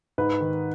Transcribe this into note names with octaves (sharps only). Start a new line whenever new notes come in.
G#2 B4
D#3